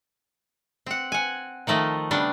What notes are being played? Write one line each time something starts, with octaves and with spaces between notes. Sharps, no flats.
C4 F#5
F#5 G#5
D#3 F3 A3 D#5
C#3 G3 B3 D4